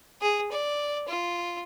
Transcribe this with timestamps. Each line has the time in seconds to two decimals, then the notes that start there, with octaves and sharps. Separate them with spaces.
0.21 G#4
0.52 D5
1.08 F4